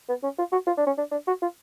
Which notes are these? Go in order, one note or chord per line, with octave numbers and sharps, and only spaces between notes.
B3
C#4
F4
F#4
F4
D4
C#4
D4
D4
F#4
F4